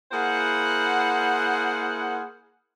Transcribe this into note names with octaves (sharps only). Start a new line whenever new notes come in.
A#3 E4 G#4 C5 F#5